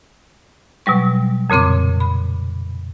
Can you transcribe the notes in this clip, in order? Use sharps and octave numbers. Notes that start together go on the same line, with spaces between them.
B2 F#3 G3 C#6
F2 A#2 C#3 C4 D6
B5